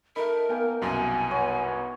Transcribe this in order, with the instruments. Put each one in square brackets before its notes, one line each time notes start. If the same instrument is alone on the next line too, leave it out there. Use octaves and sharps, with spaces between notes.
[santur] A3 D#4 [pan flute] A#4 [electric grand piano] B5
[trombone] A#3 [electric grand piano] B3 [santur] G5 G#5
[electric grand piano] C2 F#2 B2 [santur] G5 [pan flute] G#5
[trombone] B3 [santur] C#5